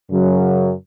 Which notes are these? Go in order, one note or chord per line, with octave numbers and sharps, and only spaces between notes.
F#2 C#3 F#3